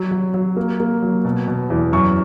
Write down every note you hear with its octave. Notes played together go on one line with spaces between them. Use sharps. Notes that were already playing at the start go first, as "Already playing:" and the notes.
Already playing: F#3
F#3
F#3
A#3
A#3
F#3
B2
B2
E2
F#2 C#6